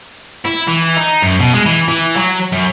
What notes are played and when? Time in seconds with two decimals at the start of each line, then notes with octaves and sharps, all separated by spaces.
0.45 E4
0.67 E3
0.97 D#4
1.22 F#2
1.40 B2
1.54 G#3
1.66 E3
1.88 E3
2.16 F#3
2.52 F#2